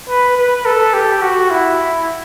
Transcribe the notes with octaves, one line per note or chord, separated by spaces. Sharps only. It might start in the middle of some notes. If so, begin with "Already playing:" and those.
B4
B4
A4
G4
F#4
E4